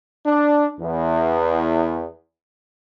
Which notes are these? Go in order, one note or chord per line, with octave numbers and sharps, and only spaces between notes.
D4
E2